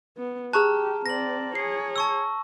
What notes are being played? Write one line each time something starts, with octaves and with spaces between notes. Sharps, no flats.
B3
G4 G#4 A5 A#5 C#6 F6 F#6
C4 D5 A#6 F#7
G#4 C#5 C7
A5 C#6 E6